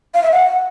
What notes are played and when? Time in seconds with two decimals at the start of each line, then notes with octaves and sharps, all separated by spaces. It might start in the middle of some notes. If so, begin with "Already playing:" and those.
0.14 F5
0.23 E5
0.32 F#5